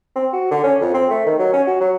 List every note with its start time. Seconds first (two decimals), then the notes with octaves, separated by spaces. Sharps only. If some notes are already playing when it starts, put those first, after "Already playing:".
0.16 C4
0.33 F#4
0.51 D3
0.63 C#4
0.81 F2
0.94 C4
1.10 A3
1.26 D#3
1.39 F#3
1.53 C#4
1.67 F#4
1.81 F#3